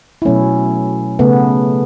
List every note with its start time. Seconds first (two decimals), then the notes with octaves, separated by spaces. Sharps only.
0.22 E4
0.25 B2 F#3 A3 C#4
1.19 C#3 A3 B3